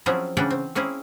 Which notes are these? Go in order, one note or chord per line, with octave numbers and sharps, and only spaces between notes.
F3 F#3 C4 C#4 E4 G#4
C#3 E3 C#4 D4 F#5 G5
C4
A#3 C4 C#4 E4 G#4